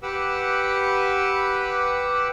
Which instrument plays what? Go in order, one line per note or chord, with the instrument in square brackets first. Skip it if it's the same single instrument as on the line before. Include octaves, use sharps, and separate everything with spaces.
[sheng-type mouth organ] G4 B4 F#5 D6 E6